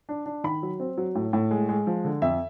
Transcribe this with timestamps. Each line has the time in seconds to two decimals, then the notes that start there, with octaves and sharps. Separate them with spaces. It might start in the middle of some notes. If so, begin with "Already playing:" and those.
0.09 D4
0.26 D4
0.44 D#3 B5
0.63 F#3
0.80 C4
0.97 F#3
1.15 A2
1.33 A2
1.51 G#3
1.69 G#3
1.87 F3
2.05 D3
2.22 F2 E5